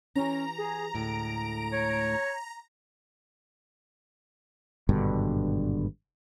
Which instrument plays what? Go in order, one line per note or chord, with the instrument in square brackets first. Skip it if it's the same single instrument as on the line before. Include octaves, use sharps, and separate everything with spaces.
[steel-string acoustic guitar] E3 G4 [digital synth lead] C#4 [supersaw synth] A#5
[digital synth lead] G#4
[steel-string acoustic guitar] D2 A2 G#3 [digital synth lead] D7
[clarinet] C#5
[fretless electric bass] G#1 G2 B2 D3